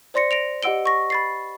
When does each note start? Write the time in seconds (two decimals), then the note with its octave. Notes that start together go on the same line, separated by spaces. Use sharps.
0.14 C5 D5 C6 A#6 C#7
0.31 A#6 D7 F7
0.63 G4 D#5 F#5 E6 D7 G7
0.86 C#6 A#6
1.10 B5 A6 C7